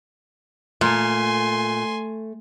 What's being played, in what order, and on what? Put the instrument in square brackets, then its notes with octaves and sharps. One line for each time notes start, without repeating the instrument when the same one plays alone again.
[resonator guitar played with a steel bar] A#2 [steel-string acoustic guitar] A3 [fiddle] G#5 C6